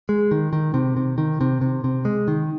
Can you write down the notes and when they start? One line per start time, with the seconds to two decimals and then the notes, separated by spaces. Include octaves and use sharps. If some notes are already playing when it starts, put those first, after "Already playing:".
0.09 G#3
0.31 D#3
0.53 D#3
0.74 C3
0.97 C3
1.18 D#3
1.41 C3
1.61 C3
1.84 C3
2.05 G#3
2.28 D#3